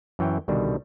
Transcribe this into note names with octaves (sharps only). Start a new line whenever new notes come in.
F#2 E3 C#5 G5
C2 B2 D3 D#3 G3